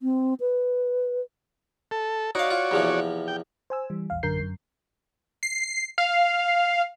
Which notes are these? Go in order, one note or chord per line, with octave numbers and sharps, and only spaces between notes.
C4
B4
A4
D#4 F#4 C#5 D5 F5
F4
E2 C3 F3
G5
C5 G#5 E6
E3 G3
A#1 E2 F5
A1 F#2 D3 A#4 G6 C7
F#2
C7
F5